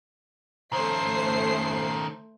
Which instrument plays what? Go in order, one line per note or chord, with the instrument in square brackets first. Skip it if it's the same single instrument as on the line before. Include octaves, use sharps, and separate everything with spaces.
[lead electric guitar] D#3 C#4 [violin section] A3 C5 C7